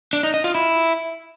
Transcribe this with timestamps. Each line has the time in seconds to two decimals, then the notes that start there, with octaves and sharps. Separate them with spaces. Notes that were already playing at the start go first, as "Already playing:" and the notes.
0.13 D4
0.23 D#4
0.34 D#5
0.44 F4
0.55 E4